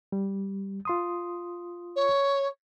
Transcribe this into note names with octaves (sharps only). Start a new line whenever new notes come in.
G3
F4 C6 D#6
C#5